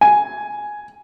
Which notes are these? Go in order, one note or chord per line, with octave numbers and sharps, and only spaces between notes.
G#5